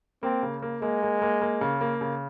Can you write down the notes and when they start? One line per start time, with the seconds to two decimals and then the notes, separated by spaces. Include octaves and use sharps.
0.23 A#3 C4
0.43 C#3
0.62 A#3
0.82 G#3 A#3
1.02 A#3
1.22 A#3
1.41 A#3
1.61 C#3
1.81 A#3
2.01 C#3